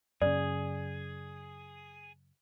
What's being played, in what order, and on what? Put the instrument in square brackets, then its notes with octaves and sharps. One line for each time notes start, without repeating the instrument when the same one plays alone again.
[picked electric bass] F#2 C#3 [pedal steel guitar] G#4 [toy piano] D5